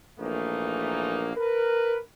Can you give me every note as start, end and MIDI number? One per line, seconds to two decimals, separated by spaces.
0.19 1.31 34
0.19 1.31 42
0.19 1.31 52
0.19 1.31 57
0.19 1.31 58
0.19 1.31 63
1.37 1.97 70
1.37 1.97 71